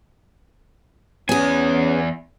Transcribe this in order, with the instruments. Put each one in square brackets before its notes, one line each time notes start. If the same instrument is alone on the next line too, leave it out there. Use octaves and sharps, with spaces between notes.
[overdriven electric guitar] E2 G#5 [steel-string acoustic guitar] B3 G#4 [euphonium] C#4